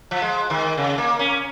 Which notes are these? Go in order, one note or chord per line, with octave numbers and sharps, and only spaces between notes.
F3
G#3
D#3
C#3
A#3
C#4